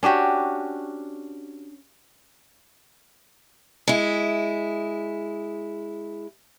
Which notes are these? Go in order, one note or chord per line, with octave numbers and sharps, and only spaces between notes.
C#4 D4 F#4 G4
G#3 E4